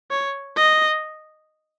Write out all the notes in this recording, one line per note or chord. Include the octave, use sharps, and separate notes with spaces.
C#5
D#5